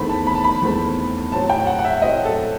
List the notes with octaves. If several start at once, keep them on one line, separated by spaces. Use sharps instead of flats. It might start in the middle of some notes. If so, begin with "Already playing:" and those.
Already playing: E2 D#3 A3 C4 B5
A5
B5
A5
B5
E2 D#3 A3 C4
A2 F#3 C4 A5
G5
F#5
F#5
E5
A2 F#3 C4 D#5
A4